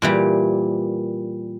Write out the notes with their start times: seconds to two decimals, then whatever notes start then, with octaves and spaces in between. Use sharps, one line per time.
0.02 A#2 E3 G3